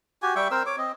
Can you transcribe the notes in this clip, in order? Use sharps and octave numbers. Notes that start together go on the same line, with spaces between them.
F#4 G4 G#5
G3 E5 G5 C#6
C4 A#4 C5 E6
C#5 D6
C4 D#5